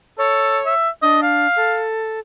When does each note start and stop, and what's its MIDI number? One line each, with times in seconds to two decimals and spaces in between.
0.18 0.59 69
0.18 0.74 73
0.66 0.89 76
1.02 1.47 62
1.02 1.18 75
1.22 1.84 77
1.56 2.20 69